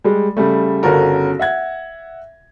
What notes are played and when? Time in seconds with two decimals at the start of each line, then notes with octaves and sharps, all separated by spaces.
0.04 G3 G#3
0.37 C#3 G3 A3
0.83 G1 C#3 C#4 F#4 A4 A#4
1.39 E5 F#5 G#6